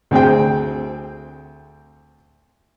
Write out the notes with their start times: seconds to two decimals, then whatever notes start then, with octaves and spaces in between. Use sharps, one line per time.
0.11 D2 C4 G#4 G5